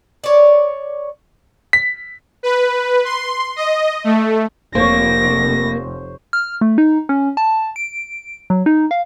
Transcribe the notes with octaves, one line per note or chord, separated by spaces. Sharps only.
C#5 D5
B6
B4
C6
D#5
A3
F1 A#3 C5 C#5 A#6
F6
A3
D#4
C#4
A5
D7
F#3
D#4
F5